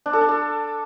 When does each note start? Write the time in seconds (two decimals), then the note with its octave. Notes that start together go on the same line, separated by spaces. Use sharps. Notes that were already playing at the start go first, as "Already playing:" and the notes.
0.06 D4
0.13 A4
0.21 D4
0.29 A4